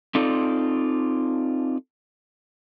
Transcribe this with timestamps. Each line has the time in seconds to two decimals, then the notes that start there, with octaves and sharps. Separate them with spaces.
0.15 C4 D#4 F4 A4 D5